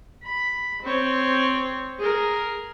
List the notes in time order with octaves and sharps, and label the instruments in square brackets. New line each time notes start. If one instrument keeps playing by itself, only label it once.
[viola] B5
C4 C#5
G#4 A#4